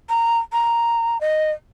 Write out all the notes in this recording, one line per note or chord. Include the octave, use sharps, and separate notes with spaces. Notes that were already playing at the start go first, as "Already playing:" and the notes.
A#5
A#5
D#5